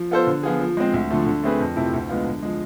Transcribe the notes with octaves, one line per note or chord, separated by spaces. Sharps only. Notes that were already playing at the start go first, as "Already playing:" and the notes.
Already playing: F3
B3 F4 A4 C5
D3
F3 B3 F4 G#4
F3
G#3 C4
D2
D3 F3 A3
D3
A3 C4 G#4 B4
F2
C3 F3 A3 E4
D2
D3 G#3 B3 F4
D3
F3 G#3